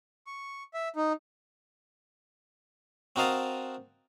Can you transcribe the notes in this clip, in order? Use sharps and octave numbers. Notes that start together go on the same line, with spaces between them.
C#6
E5
D#4
C4 F#4 A#4 D#5 F5 A5